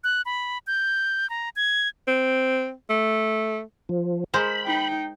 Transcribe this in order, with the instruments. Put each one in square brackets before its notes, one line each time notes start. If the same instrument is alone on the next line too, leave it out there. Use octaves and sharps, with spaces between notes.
[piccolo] F#6
B5
G6
A#5
G#6
[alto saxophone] C4
A3
[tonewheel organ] F3
[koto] G#3 A#4 C5 [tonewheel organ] B5
[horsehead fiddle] D#4 G5